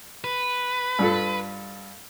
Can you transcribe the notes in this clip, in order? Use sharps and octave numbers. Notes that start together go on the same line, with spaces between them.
B4
G2 F4 A4